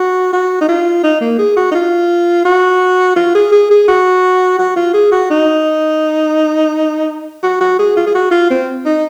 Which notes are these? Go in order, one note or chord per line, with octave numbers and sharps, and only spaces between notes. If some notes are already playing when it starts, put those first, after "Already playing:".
Already playing: F#4
F#4
D#4
F4
D#4
A#3
G#4
F#4
D#4
F4
F#4
F4
G#4
G#4
G#4
F#4
F#4
F4
G#4
F#4
D#4
F#4
F#4
G#4
F4
G#4
F#4
F4
C4
D#4